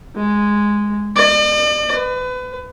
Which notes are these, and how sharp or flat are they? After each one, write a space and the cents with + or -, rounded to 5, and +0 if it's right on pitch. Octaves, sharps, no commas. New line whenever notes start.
G#3 -5
D5 +45
B4 +30